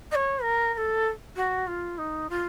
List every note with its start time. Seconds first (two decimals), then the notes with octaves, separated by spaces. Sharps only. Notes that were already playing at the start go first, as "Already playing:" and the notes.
0.11 D#5
0.15 C#5
0.42 A#4
0.74 A#4
0.77 A4
1.36 F#4
1.67 F4
1.98 D#4
2.29 F4